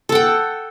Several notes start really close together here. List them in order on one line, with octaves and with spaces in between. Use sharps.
A4 F#5 G5